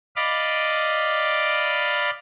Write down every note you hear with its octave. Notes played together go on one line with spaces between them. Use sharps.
D5 D#5 F5 B5 D6